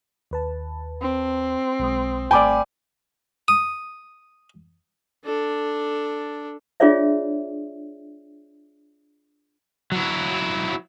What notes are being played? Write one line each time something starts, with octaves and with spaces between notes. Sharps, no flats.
D#2 B4 A5
C4
B1 G#3 D#6
G#1 A3 D5 G5 G#5 B5 D6 E6
D#6
D4 A4
D4 F4 G#4 C#5 D5 E5
F#3 E4